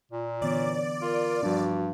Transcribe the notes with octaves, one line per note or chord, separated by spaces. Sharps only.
A#2 F4
D3 E3 B3 C#5 D5
F4 A#4
G2 F3 G3 D4 F#4